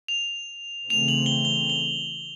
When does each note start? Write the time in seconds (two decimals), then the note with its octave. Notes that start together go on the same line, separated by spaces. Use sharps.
0.08 F7
0.90 C#3 E3 A3 C4 F7
1.08 F#7
1.26 G7
1.45 G7
1.70 G7